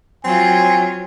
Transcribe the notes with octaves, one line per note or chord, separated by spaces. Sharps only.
F#3 C4 F4 G#5